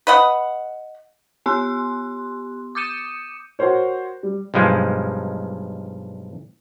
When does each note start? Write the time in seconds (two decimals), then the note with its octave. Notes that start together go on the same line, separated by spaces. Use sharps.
0.07 B4 D#5 F#5
1.46 B3 G4 C6 F#6
2.75 D6 D#6 G6 C#7 D#7 E7
3.59 F#4 A#4 C5 C#5
4.23 G3
4.54 B1 G2 F3 G#3